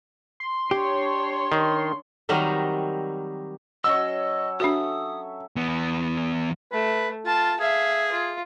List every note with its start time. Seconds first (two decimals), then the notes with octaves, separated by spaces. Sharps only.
0.40 C6
0.71 D4 G4 C#5
1.52 D#3
2.29 D#3 F#3 G3 C4 D#4 A#4
3.84 F#3 C#4 D#5 C#6 E6
4.60 D4 F#4 A4 E5 D#6
5.56 E2 B3
6.72 A3 B4
7.26 F4 A5
7.60 G#4 E5 F5
8.12 F4